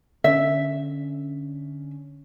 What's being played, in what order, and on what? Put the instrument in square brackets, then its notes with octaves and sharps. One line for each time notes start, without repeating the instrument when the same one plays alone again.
[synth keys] D3 C#4 [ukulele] E5